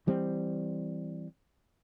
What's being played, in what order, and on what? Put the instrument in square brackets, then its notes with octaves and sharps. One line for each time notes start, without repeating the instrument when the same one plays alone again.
[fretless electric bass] E3 G3 C4